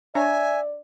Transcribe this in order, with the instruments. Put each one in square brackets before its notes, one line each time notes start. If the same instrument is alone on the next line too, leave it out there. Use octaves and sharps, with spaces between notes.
[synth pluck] D4 C#5 A#5 [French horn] D5 [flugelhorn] E5 [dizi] G#5